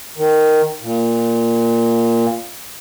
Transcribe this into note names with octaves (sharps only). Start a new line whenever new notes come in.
D#3
A#2